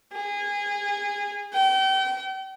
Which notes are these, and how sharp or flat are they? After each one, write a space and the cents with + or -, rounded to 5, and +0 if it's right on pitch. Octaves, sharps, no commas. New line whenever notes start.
G#4 -25
G5 -35